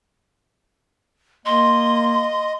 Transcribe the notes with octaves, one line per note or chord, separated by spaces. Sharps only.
A#3 D#5 C6